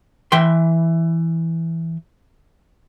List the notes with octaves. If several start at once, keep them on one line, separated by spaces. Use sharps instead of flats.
E3 E5 G5 C6